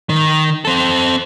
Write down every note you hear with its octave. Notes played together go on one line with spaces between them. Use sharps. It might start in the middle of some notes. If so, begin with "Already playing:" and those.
D#3
C4 A4